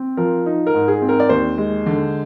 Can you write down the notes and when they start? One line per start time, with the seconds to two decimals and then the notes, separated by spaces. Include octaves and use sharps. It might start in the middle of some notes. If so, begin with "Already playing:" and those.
Already playing: C4
0.17 F3 A#4
0.46 D#4
0.67 A#4
0.74 G#2
0.88 G#4
1.02 C4
1.09 A#4
1.20 D5
1.29 D#2 C5
1.58 G#3
1.86 D3